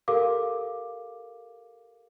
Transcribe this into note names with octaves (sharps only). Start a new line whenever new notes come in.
G4 A4 A#4 F5 D6